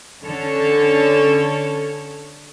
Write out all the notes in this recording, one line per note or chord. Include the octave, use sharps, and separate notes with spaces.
D3 C#4 A4 C#5